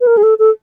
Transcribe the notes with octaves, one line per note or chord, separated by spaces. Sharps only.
B4
A#4
G#4
A4
A4